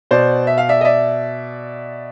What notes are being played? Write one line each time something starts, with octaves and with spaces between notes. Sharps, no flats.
B2 C5 D5
E5
F5
D5 E5
D#5
D5 E5